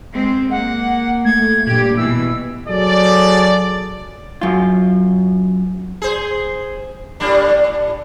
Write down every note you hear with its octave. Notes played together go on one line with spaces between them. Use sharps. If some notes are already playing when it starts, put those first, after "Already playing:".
G#3 C4
A#3 F#5
A3 G#6
G2 A#2 G4
B2 E3 E6
F#3 G#4 A4 D5
F#2 F4
G#4 C5
A2 G3 D4